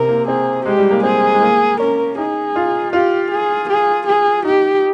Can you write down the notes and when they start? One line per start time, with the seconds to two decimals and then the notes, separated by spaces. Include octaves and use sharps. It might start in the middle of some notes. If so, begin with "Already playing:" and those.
Already playing: C3 A#4
0.08 A#3
0.28 C4 G#4
0.65 G#3 G4
0.78 G3
0.91 A#3
1.03 C4 G#4
1.34 G#3
1.41 A#3
1.79 C#4 A#4
2.18 D#4 G#4
2.56 F4
2.93 F4 G4
3.31 G#4
3.69 G#4
4.06 G#4
4.45 D#4 G4